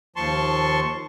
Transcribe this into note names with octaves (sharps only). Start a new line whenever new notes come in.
D#2 F3 A5 C6 C#6